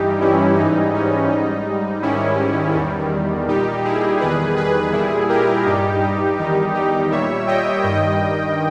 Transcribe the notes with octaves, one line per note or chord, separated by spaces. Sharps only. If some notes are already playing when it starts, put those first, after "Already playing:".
Already playing: G2 E3 G3 D#4 G4
C#4 E4
G#2 E3 G3 D#4
C#4
G#2 G3 D#4
G#2 D#3 G3 C#4 E4
E2 D#3 G3
A#2 G3 D#4 G4
E4 G#4
E2 D#3 G3 G#4 B4
G#4 B4
A#2 G3 E4 G#4
G4 A#4
G2 G3 D#4 G4
D#4
E2 D#3 G3 D#4 G4
D#4 G4
A#2 G3 C#5 E5
D#5 G5
G2 D#3 G3 D#5 G5